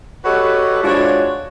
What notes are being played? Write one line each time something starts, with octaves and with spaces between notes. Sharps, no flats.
F#4 G4 A4 B4 C#5 D#5
G#3 D4 F4 F#4 C5 C#5